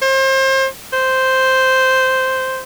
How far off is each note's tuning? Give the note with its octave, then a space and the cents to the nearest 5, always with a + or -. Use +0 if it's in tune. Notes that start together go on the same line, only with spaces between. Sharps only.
C5 +35
C5 -5